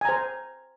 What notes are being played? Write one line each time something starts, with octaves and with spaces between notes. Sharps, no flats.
C5 G#5 A#5